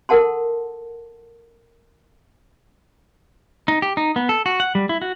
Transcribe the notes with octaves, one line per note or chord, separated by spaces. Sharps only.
A4 A#4 F#5 A5 C6
D#4
G4
D#4
B3
A4
F#4
F#5
G3
E4
F#4